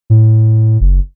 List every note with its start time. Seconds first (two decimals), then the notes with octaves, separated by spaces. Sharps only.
0.10 A2
0.81 F#1